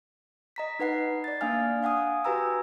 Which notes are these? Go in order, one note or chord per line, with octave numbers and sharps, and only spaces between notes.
D#5 A#5 B6
D#4 B4 F#5 C7
D5 A6
A#3 D4 F5 G#5 F6
F5 F#5 G#5 D#6
F#4 G4 B4 G#5 A#5 E6